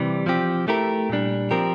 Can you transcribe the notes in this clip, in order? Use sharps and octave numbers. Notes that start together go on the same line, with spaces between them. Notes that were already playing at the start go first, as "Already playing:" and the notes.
Already playing: C3 E3 G3
F3 C4 G4
A3 E4 G4 A#4
A#2 G3 D4
F3 C4 G4 A#4